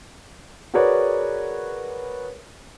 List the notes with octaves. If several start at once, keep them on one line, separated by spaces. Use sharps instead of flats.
F#4 G#4 A#4 B4 C#5 D5